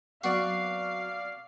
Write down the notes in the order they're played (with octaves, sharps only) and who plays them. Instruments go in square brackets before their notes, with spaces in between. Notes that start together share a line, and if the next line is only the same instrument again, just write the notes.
[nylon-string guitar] F#3 B3 C4 [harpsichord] F#4 [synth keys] D5 C7 [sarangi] F5